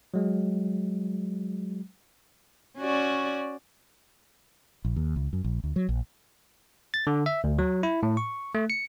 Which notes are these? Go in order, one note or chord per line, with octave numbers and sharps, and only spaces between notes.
F#3 G#3
C#4 F#4 D5
A#1
D#2
C#2
F#2
A#1
D2
F#3
A#1
A6
D3
E5
D2
F#3
E4
A2
C#6
A3
C#7